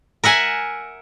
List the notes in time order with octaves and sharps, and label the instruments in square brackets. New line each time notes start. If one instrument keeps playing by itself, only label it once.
[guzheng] A#4 E5 F#5 G#5